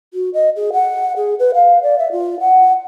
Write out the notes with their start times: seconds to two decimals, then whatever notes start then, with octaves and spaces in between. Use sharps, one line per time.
0.13 F#4
0.34 D#5
0.56 G#4
0.73 F#5
1.16 G#4
1.39 B4
1.54 F5
1.82 D5
1.98 E5
2.12 F4
2.40 F#5